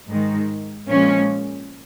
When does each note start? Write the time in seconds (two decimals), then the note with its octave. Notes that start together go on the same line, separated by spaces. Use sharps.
0.09 G#2 D#3 G#3
0.89 A#2 F3 G#3 C#4